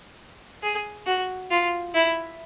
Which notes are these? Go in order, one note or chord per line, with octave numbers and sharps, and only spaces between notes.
G#4
F#4
F4
E4